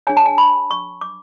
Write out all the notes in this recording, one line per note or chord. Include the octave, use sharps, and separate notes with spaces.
D4 G#4 C#5 G#5
A5
G#5
B5
C#6
D6